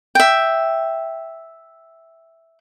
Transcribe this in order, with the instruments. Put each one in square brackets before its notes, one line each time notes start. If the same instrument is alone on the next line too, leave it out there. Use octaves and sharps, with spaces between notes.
[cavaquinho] E5 G5